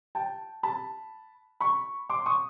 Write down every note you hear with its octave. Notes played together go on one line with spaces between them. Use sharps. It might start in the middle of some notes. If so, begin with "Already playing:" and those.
G5 A5
A5 B5
B5 C#6
C6 D6
C#6 D#6